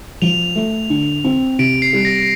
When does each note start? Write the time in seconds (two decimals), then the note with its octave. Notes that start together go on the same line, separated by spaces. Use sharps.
0.22 F3 F7
0.56 A3
0.90 D3
1.24 C4
1.59 C3 D7
1.82 C7
1.93 G3
2.05 A#6